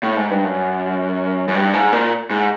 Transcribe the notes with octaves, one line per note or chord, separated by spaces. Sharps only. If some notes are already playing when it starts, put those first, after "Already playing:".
A2
G#2
G2
F#2
F#2
G2
G#2
A#2
G#2